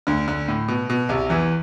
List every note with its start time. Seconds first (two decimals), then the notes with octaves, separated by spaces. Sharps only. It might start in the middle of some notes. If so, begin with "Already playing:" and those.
0.07 D2 D3
0.28 D2 D3
0.48 A2
0.68 B2
0.90 B2
1.09 C2 C3
1.30 E2 E3